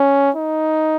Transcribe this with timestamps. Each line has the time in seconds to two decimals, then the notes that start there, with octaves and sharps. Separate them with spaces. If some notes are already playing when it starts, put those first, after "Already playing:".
Already playing: C#4
0.36 D#4